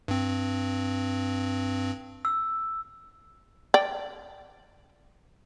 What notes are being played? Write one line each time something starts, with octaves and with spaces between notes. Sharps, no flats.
G2 C4
E6
D5 G5